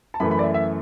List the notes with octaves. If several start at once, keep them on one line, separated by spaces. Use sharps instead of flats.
A5
F#2 E3 A3 B5
B5
D5
E5
E5